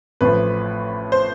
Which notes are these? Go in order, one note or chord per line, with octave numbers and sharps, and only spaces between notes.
A1 A2 F3 B4
C5